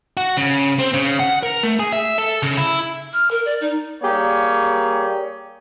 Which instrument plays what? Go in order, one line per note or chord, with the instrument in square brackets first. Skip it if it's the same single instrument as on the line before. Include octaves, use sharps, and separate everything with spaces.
[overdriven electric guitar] F#4
C#3
C4
C#3
F#5
A#4
A3
G#4
E5
A4
C#3
E4
[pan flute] F6
A#4
D5
D#4
[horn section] G3 A#3 G4 G#4 C#5